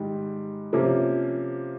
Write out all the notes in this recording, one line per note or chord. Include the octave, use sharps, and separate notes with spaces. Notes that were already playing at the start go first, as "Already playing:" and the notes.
Already playing: G#2 D#3 G3
C3 F3 A#3 C#4